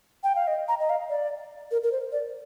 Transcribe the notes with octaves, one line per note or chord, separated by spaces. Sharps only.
G5
F5
D#5
A#5
D#5
F5
D5
A#4
A#4
C5
D5